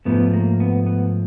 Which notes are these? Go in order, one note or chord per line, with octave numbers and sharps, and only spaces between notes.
G#2 F3 A3 B3
A#3
B3
B3